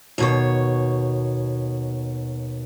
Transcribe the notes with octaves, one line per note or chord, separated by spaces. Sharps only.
D#2 B2 C#5